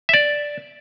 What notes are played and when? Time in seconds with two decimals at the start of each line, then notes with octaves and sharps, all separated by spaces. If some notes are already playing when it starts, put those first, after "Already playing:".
0.09 E5
0.14 D5